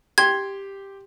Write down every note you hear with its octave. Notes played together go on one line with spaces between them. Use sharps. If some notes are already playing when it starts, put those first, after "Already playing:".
G4 C6 G#6